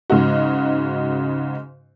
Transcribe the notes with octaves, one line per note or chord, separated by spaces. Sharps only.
G#2 C#3 G#3 D#4 F#4